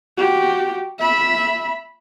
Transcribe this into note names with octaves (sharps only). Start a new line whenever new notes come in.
F#4 G4
E5 B5